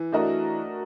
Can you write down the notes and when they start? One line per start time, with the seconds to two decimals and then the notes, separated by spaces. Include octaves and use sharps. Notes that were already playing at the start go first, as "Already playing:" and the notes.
Already playing: E3
0.12 A3 D4 F#4 A#4 D#5